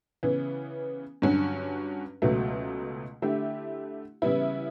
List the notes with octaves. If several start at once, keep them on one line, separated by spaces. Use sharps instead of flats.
C#3 E3 B3
G2 D3 F#3 C#4 F#4
C#2 B2 F#3 A3
D3 A3 E4 G4
C#3 E3 G3 B3 E4